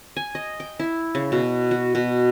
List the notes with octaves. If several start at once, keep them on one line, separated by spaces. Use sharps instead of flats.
G#5
D#5
G5
E4
C#3
B2
F#4
B2